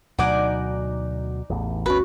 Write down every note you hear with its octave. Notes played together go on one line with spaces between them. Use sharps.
D2 B2 F#3 D#4 D5 F#5 G#5 D6
A1 E2
G1 D2 C#4 F#4 B4 C#6